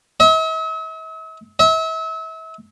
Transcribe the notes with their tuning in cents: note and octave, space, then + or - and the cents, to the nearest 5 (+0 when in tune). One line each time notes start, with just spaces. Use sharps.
E5 -45
E5 -35